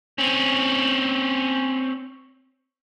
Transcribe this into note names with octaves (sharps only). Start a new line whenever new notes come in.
C4 C#4